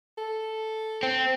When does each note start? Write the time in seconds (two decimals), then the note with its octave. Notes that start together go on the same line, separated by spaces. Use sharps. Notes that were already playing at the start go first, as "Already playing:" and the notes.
0.18 A4
1.03 C4